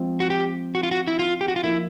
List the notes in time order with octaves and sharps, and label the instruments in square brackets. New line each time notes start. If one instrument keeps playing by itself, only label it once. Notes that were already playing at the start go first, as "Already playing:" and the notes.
Already playing: [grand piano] F3 G#3 C4
[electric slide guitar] F#4
G4
F#4
F4
F#4
E4
F4
G4
F#4
F4
[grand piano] F3 A#3 D#4 [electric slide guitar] E4